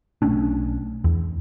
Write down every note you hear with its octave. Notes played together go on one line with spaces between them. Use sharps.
B1 A3 C#4 D4
E2